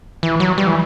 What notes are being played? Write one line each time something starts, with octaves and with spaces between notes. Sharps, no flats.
E3
F#3
G3
E3